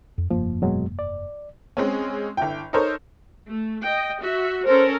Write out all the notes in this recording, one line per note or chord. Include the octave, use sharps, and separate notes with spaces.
F2
F1 G2 F3 A#3
B2 F#3 G#3
D5
G#3 C4 C#4
G1 E4 G5
D#4 A4 A#4 C5 C#5
A3
D#5 G5
F#4 E5
C#4 A4 A#4 C5